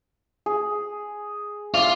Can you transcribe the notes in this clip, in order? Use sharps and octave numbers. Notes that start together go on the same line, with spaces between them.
G#4
F4 D5 E5 F5